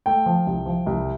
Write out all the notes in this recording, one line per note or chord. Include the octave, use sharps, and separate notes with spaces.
A3 G5
F3
C2
F3
C2